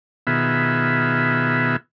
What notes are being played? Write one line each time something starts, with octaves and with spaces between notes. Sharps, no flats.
B2 D#3 B3 F4 G#4 E5